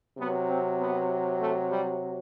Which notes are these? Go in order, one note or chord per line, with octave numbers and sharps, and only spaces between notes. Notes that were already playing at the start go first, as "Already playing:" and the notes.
C3 F#3 B3
C4
B3
A3
G3